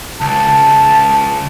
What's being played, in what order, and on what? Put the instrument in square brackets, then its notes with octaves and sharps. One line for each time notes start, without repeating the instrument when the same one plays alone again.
[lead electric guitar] C#2 [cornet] A5